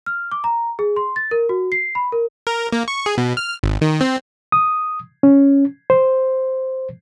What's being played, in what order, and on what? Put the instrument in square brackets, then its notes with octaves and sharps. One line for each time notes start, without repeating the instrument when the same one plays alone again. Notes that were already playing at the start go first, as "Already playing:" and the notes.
[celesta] F6
D6
A#5
G#4
C6
A6
A#4
F#4
C7
B5
A#4
[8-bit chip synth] A#4
A#3
C#6
G#4
B2
F6
G#1
D#3
C4
[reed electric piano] D#6
C#4
C5